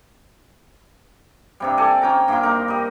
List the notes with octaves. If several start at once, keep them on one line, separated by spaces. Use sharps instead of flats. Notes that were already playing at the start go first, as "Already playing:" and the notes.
G2 C3 G3
A4 D5 G#5
C#4 G5 A#5
G2 A#3 C6 D6
D#4 A#4
G3 D#5